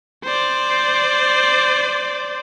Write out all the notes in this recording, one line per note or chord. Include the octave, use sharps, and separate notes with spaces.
C5 D5